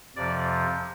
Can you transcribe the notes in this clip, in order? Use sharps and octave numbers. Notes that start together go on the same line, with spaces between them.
F2 C3 F3 D5